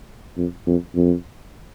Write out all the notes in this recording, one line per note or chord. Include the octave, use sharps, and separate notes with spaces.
F2
F2
F2